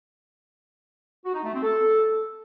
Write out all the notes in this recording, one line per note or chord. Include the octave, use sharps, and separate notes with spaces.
F#4
D#4
A3
C4
A4